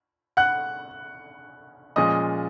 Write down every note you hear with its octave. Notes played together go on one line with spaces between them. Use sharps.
F#5 F#6
A#2 F3 G#3 C#4 D#5 D#6